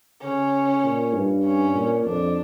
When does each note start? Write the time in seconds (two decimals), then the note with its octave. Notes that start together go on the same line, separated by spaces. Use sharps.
0.22 C#3 C#4
0.84 A#2
1.13 G2
1.45 C#4
1.74 A#2
2.05 F2 D4